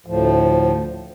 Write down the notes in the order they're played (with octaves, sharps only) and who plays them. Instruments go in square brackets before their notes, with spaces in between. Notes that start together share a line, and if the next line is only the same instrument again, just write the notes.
[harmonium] D2 A2 F3